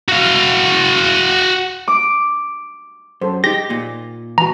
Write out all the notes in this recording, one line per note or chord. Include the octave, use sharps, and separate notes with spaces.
F#4 F5
D6
F#2 A4 C5
D#4 G4 G#4 A#6
A#2
E3 F#4 A#5